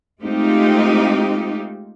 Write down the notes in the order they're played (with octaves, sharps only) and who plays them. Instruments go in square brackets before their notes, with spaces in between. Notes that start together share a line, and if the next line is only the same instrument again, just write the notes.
[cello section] G#3 A3 C4 D#4 F4 G4